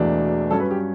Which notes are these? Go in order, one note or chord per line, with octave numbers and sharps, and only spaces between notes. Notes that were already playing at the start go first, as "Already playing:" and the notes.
Already playing: E1 E2 B2 A3 D4
G2 F#3 C#4 A4
B4
G4